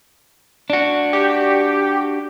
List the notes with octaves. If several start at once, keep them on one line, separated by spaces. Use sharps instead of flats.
D4 F#4
G4